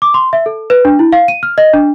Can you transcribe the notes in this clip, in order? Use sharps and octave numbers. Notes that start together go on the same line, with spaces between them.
D6
C6
E5
A4
B4
D4
E4
F5
D#7
F6
D#5
D4